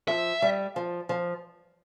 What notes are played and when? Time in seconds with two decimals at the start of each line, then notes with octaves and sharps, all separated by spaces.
0.08 F3 E5
0.42 G3
0.76 F3
1.09 F3